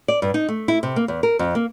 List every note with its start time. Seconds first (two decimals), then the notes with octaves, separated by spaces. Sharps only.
0.08 D5
0.22 G2
0.34 D#4
0.48 A3
0.68 E4
0.83 C3
0.96 A#3
1.08 E2
1.23 A#4
1.39 F2
1.55 A#3